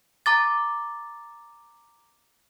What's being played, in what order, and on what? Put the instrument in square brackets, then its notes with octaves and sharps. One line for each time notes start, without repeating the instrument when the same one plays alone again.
[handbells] A#5 D6 A6